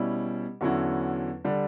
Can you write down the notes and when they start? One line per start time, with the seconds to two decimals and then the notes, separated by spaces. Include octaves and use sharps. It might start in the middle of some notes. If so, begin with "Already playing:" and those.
Already playing: B2 G3 C#4 E4
0.61 E2 D3 F#3 C#4 E4
1.44 D3 G3 D4